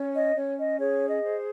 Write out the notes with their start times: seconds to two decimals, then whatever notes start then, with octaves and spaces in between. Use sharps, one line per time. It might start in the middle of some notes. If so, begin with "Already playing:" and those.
Already playing: C#4 C#5
0.14 D#5
0.35 C#4 C#5
0.57 D#5
0.79 G#4 C#5
1.08 D#5
1.23 C5